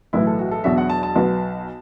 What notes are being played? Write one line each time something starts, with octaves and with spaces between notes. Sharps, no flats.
B1 A2 E3 E4
A4
F#4
A4
E2 B2 F#3 D4 F#4 E5
F#5
A5
A5
B1 B2 B3 F#4 B4